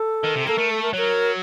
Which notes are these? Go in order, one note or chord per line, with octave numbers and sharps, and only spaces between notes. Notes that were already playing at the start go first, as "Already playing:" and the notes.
Already playing: A4
D#3
C3
A#3 A4
A3 A#4
A4
A#4
F#3 A#4